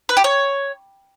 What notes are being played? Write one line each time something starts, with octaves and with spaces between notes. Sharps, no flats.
B4
G4
C#5